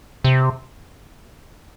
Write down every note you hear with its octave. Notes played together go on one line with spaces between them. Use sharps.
C3